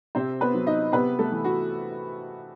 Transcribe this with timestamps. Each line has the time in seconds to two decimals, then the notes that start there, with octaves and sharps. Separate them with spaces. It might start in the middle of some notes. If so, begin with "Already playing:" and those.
0.15 C3 C4 C5
0.41 B3 B4
0.54 F#3
0.66 D#4 D#5
0.92 C3 B3 B4
1.19 A3 A4
1.32 E3
1.44 F#4